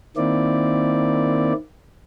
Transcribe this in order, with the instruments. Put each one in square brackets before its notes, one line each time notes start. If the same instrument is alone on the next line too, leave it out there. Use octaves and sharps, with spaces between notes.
[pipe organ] D#3 A#3 C4 E4 D5